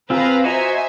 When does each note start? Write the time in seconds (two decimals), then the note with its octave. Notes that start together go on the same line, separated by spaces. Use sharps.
0.10 C4 F4 G#4 B4 F5 A#5
0.44 F#4 C5 D#5 E5 G#5 A#5